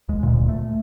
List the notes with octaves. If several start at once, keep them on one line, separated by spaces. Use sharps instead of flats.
D#2 G#3
D1 D2 A#2
A3